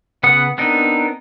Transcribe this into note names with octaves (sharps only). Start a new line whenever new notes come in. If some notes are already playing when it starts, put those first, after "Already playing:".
C#3 B3 B4 F#5 D#6
B3 C4 D4 D#4 A#4